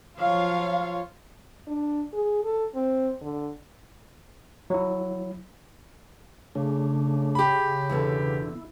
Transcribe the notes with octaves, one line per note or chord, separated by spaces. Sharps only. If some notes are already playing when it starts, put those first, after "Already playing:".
F3 F#3 F4 C#5 F5
D4
G#4
A4
C4
D3
F#3 E4
C#3 A3 D4
G4 B5
E2 B2 D3 E4